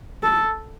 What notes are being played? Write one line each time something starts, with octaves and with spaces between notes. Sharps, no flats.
A4